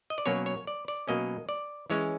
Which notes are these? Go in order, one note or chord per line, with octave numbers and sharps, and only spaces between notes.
D#5
D5
B2 F#3 A#3 C#4 C#5
C#5
D5
D5
B2 F#3 A#3 C#4 D#5
D5
E3 G#3 C#4 C#5